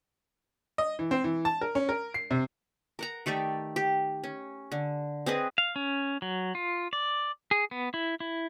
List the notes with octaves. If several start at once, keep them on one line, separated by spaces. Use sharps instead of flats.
D#5
E3
C4
E3
A5
A#4
C#4
A#4
C7
C3
A#4 F#5 A#5
D#3 A3 G4 D5
G4
C#4
D3
C4 G#4 B4 D#5
F5
C#4
F#3
F4
D5
G#4
B3
E4
E4